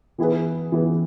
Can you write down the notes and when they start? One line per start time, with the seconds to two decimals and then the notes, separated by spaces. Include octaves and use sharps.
0.18 E3 B3 E4 G#4 B4
0.72 E3 B3 E4 G#4 B4